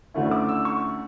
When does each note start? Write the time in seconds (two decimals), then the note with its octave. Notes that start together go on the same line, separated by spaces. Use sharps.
0.14 D2 D3 A3 C#4 E4
0.31 D6
0.49 E6
0.65 C#6